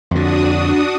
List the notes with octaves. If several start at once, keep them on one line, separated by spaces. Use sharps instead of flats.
F2 D3 D4 F#4 D#6